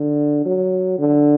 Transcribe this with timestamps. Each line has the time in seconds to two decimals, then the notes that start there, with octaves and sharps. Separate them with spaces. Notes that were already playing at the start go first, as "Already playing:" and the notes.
Already playing: D3
0.45 F#3
0.98 D3